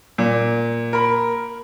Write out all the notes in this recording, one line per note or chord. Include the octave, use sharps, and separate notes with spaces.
A#2
A#4 B5